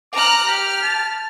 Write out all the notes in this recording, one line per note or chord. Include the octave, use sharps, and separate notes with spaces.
A#5 D6 F6 F#6
G4 F6
A5